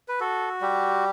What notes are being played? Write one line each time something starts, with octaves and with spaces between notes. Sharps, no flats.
B4
F#4 A4
G3 G4